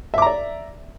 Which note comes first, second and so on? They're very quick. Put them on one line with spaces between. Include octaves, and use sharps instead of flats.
E5 D6 A#5 D5